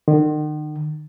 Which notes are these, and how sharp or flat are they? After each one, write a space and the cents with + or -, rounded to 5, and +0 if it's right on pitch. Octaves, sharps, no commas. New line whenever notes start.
D#3 -40